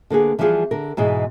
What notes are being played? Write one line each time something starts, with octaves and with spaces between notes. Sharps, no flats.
D3 A#3 B3 G#4
E3 F3 G3 B3 F4 G#4
D3 A#4
G#2 B2 E3 G#3